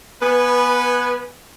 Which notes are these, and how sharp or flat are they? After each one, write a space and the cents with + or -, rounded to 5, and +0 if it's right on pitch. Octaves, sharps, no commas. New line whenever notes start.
B3 -20 B4 +0 G#5 +0